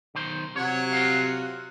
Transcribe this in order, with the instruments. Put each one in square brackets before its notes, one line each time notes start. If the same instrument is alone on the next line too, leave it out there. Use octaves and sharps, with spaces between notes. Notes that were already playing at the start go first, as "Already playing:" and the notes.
[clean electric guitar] B1 D#3 C5
[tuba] C3 [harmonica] F#3 F#5 [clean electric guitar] C#5
[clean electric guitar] F4 F#4 F5